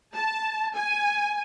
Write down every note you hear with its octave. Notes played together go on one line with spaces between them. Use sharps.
A5
G#5